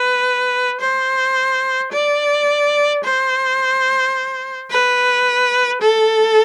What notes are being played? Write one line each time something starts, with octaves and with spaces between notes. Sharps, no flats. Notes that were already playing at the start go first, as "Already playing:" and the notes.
Already playing: B4
C5
D5
C5
B4
A4